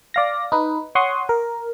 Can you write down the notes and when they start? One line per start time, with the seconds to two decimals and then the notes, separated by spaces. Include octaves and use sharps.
0.14 D5 F5 A#6
0.52 D#4 B4
0.95 C#5 F#5 C6 C#6 D#6
1.29 A#4